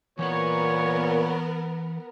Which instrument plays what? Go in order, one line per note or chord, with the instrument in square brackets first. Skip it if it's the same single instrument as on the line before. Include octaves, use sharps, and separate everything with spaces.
[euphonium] A#2 [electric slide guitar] E3 C5 F#5 [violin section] B3 A#4 [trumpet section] C#5